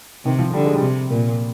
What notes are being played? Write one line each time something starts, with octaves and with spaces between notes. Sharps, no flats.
C3 D#3
F3
D3 G3
G#3
G3
C3
A#2 A#3